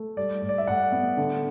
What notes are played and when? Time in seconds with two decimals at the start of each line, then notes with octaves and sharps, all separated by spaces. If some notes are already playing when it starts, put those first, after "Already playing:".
Already playing: A3
0.17 G3 D5
0.42 A2
0.49 D5
0.58 E5
0.67 A2 F#5
0.92 B3
1.17 D3